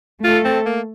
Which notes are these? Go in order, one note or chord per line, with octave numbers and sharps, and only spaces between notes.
A3 F4 A4
C4
A#3